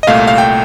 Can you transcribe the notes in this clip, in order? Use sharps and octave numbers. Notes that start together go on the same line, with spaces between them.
D#5
C2 A#2 A3 F5
F5
G5